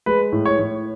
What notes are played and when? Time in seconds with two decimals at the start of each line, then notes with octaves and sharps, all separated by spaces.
0.06 G#3 B4
0.32 A2
0.46 C#5
0.59 A2